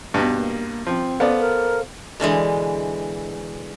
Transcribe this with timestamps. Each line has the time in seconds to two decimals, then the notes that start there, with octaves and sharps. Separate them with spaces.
0.14 G2 B2
0.33 A#3
0.87 F3 C4
1.20 B3 A4 C5 D5 F5
1.40 A#4
2.20 B2 D3 E3 G#3